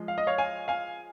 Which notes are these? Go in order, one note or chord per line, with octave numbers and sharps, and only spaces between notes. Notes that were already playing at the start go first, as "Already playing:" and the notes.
Already playing: F3 G#3
F5
D#5
C#5 F5
F5 G#5
F5 G#5